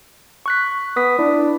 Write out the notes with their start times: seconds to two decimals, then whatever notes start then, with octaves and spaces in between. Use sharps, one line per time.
0.46 C#6 F#6 B6
0.96 B3 D#6 B6
1.19 D4 E4